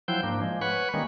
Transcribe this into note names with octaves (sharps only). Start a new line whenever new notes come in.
F3 F#3 E4 C5 G5 G6
G#2 A#3 D4
F3 G#3
B4 C#5 F#5 B5 C#6
D#3 G3 G#3 A#3 C#4